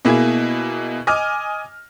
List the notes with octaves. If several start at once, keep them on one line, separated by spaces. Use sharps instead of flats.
B2 A#3 E4 G#4
D#5 G#5 D6 F6